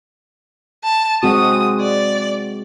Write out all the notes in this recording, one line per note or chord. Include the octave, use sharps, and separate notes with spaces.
A5
G#3 C4 F#4 D#6
D5